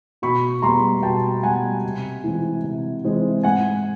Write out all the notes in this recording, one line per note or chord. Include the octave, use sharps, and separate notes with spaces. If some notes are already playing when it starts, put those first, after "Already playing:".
B2 B5 C#6
G3 B3 A#5 C6
B2 G5 A5
G3 B3 F#5 G#5
C3
E3 G#3 C4
C3
E3 G#3 C4
G#2 F#5 G#5